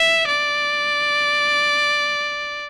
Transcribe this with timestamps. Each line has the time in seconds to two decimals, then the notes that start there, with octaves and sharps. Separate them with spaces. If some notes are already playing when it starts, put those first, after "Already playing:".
Already playing: E5
0.27 D5